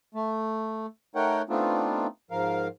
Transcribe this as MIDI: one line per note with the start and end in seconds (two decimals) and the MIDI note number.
0.15 0.86 57
1.15 1.42 57
1.15 1.42 63
1.15 1.42 70
1.15 1.42 73
1.15 1.42 78
1.15 1.42 79
1.49 2.07 57
1.49 2.07 59
1.49 2.07 60
1.49 2.07 62
1.49 2.07 63
1.49 2.07 65
2.31 2.68 44
2.31 2.68 53
2.31 2.68 70
2.31 2.68 77